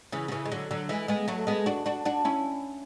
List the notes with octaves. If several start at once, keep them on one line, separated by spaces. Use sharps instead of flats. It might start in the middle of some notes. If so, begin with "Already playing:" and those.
C#3 E3
D3
C#3 E3
G#3
D3 F#3
D3 F#3
E3 G#3
G#3 B3
F#3 A3
G#3 B3
D4 F#4
D4 F#4
D4 F#4
C#4 E4